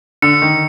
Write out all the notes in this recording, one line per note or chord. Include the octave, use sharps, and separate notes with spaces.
D3 C#7
D#3